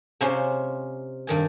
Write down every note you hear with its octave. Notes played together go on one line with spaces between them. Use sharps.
C3 G#3 C#4 F4 C5 C6
G2 D#3 G#5